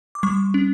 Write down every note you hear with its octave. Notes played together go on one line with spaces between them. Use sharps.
D6
G3 C#6
C#4